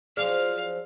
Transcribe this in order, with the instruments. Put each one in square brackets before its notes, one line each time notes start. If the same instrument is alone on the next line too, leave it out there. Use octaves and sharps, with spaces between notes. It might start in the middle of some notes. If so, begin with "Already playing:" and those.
[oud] F3 F#3 C#4 [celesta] G#4 D5 F6 [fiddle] F5